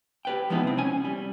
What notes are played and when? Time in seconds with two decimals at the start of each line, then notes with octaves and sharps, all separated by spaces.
0.25 G4 B4 G5
0.50 F3 G#3 B3 D#4 E4
0.63 C3 C4
0.78 C#4 G#5
1.05 G3